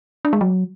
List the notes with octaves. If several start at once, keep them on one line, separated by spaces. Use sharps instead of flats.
D4
G#3
F#3